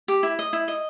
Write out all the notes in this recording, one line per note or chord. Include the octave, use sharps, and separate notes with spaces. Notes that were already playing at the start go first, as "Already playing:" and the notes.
G4
E4
D#5
E4
D#5